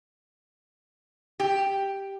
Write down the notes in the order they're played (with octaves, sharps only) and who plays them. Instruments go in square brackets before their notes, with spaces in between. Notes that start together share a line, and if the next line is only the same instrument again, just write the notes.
[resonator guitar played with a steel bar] G4